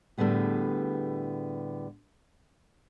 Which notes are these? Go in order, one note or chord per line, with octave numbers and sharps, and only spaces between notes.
A2 D3 G3 B3 G#4